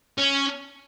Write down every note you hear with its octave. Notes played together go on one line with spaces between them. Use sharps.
C#4